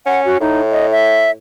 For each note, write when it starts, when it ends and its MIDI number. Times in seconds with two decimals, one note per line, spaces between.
0.06 0.36 61
0.06 0.21 78
0.25 0.37 66
0.40 1.36 45
0.40 0.61 63
0.71 0.86 75
0.92 1.31 76